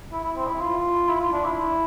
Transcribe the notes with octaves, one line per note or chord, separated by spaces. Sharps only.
E4
E4
C4
E4
F4
E4
F4
D4
E4